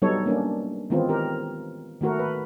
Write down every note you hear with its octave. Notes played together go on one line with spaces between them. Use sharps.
F#3 G3 B3 D#4 A4 C#5
A#3 C#4 D4
D#3 E3 G#3 B3 C4 F4
G4 A#4
D#3 A3 F#4 A#4
B4